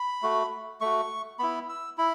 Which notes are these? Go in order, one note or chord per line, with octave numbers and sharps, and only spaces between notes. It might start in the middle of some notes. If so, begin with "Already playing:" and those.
Already playing: B5
A3 F#4
A3 F#4 C#6
B3 E4 B5
E6
E4 B5